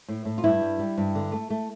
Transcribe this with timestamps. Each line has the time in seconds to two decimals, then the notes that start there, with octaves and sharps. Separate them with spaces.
0.09 A2
0.25 A2
0.38 F4
0.44 G2 E4
0.61 G3
0.79 G3
0.98 G2
1.15 D3
1.32 A3
1.50 A3